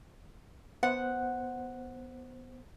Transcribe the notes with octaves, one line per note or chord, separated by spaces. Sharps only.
B3 C5 F#5 F#6